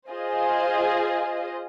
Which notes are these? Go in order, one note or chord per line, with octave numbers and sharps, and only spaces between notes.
F4 G#4 C5 D#5